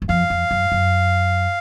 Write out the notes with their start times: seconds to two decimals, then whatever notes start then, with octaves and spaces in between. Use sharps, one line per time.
0.02 F#2
0.09 F2 F5
0.30 F2
0.51 F#2
0.72 F#2